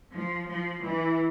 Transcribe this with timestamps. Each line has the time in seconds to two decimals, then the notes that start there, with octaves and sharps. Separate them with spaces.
0.13 F3
0.48 F3
0.83 E3